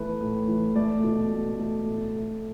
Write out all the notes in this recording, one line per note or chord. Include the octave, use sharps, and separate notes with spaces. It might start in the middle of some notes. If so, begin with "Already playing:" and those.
Already playing: E3 A3 B4
A2
E3
A3 D5
B2
A3
A3
A2
A3